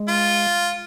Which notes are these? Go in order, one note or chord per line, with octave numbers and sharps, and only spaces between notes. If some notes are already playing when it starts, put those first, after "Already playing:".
Already playing: G#3
F4